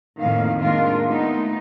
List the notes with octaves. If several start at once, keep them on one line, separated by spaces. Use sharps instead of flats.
F2 A2 D#3 A#3 F5
D#2 D#3 G#3 D4 F4 A#4
A3 B3 D#4